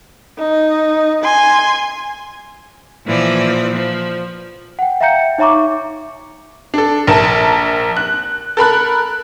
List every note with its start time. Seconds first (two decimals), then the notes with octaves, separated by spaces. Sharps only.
0.38 D#4
1.23 G#5 C6
3.05 A#2 E3 F3 D5
3.74 F3
4.79 F#5 G5
5.01 E5 F5 G5 A#5 G6 C#7
5.38 D#4 C#5 E5 A#5 C#6 D6
6.74 D4 A4
7.07 A#1 A#4 A5 E7
7.97 F#6
8.57 A4 A#4 B5 F#6